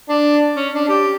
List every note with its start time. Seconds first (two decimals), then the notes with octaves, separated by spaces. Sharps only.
0.09 D4
0.56 C#4
0.75 D4
0.88 G4